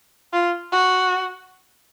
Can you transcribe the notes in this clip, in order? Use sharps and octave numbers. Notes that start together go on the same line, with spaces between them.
F4
F#4